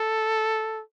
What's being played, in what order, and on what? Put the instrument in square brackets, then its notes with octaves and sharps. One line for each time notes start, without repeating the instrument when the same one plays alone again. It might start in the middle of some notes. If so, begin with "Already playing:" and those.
Already playing: [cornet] A4